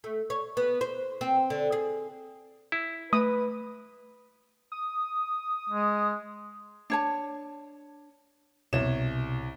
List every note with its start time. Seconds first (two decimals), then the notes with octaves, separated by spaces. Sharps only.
0.04 A3
0.30 C#5
0.57 B3
0.81 C5
1.21 C4
1.50 D3
1.72 G#4
2.72 E4
3.13 A3 B4 D#6
4.72 D#6
5.70 G#3
6.90 D4 C#5 A5
8.73 C2 B2 C#5 E7